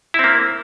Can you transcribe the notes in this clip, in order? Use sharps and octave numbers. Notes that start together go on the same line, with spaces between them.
A#3 C4 E4